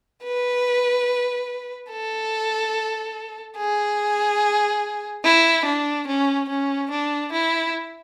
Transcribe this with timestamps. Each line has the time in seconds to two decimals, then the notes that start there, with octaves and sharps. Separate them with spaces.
0.24 B4
1.90 A4
3.57 G#4
5.24 E4
5.66 D4
6.07 C#4
6.49 C#4
6.91 D4
7.33 E4